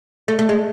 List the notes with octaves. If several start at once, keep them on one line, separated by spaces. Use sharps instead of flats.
A3
A3
G#3